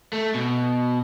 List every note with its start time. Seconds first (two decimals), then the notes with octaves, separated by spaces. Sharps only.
0.13 A3
0.35 B2